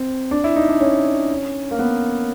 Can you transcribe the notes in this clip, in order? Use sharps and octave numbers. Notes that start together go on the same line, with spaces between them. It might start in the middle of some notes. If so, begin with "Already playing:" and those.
Already playing: C4
D4
E4
D#4
D4
C#4
A#3
B3